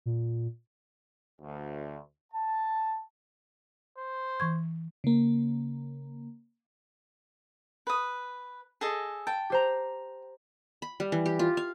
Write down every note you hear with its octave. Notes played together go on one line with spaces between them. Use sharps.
A#2
D2
A5
C5
E3 C#6 G#6
C#3 A#3
B4 D#6
G#4 A4 D#5
G5 A5
G4 C5 A#5
B5
G3
E3
G4
F4
F5